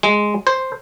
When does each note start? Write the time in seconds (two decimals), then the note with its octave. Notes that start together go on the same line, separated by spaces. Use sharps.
0.03 G#3
0.47 C5